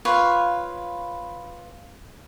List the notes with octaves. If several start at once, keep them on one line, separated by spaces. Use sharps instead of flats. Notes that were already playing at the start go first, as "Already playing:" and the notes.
F4 B4 C#5 F5